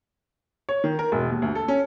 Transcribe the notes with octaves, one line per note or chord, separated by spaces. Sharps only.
C#5
D#3
A#4
E1
D#2
D2
A4
C#4